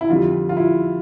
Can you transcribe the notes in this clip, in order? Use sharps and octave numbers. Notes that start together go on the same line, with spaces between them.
E4
F2 D3 G3 F4
F4
E4